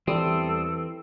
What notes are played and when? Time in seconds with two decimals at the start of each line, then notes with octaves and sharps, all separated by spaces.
0.07 E2 E3 G3 C4 A4 D#6